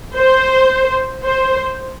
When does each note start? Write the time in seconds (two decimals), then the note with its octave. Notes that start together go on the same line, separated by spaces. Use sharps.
0.16 C5
1.22 C5